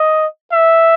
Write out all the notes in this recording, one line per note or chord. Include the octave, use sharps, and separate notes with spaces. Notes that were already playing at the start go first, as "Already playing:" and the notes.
Already playing: D#5
E5